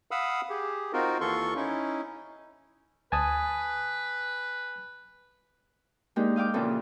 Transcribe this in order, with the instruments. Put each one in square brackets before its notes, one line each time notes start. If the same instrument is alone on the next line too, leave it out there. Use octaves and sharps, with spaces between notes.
[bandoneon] F5 F#5 B5 D#6 E6
G4 G#4
C4 D#4 F4 F#4 A#4
D#2 E3 F4 A4 C6 C#6
C#4 D#4 E4
[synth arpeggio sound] D2 [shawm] B4 [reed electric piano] G#5 A5 D#6
[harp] G#3 A#3 D4 D#4 G4
D#5 F5 G5 D6
A#2 C#3 E3 F3 C4 A4